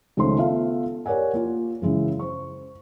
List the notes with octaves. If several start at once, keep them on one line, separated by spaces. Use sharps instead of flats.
C#2 D#3 A3 C#4 C5 C6
B3 F4 A4 E5 F5
G4 A#4 C#5 D5 F#5 G#5
A#3 F4
F#2 C#3 E3 G#3 E4
C5 C#6